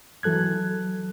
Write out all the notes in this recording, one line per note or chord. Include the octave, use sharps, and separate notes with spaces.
E3 F#3 A4 F#6 G#6